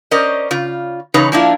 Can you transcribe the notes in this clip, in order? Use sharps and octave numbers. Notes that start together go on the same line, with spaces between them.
C#4 A#4 C5 D5 D#5
C#3 F4
C#3 E3 D#4 B4 C#5
F3 A#3 D4 E4 F4